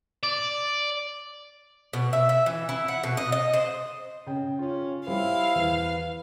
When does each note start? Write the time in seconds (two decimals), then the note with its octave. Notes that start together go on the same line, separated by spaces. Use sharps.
0.23 D5
1.93 B2
2.13 E5
2.29 E5
2.46 E3
2.69 E4
2.88 F#5
3.04 B2
3.17 D#5
3.32 D#5
3.54 C5
4.27 C#3 G5
4.59 C#4 F4
5.07 G3 E4 C5 F5
5.55 E2 B4